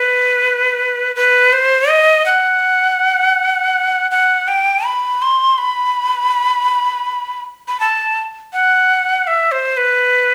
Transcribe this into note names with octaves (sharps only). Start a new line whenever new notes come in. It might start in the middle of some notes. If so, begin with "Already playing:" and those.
Already playing: B4
B4
C5
D#5
F#5
F#5
G5
B5
C6
B5
B5
A5
F#5
E5
C5
B4